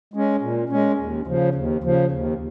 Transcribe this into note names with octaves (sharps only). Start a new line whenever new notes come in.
G#3 C#4
A#2
G#3 C#4
D#2
C#3 F3
D#2
C#3 F3
D#2